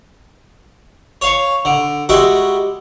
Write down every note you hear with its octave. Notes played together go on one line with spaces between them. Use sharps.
C#5 F5 C#6
D3
G3 G#3 F#4 A4 E5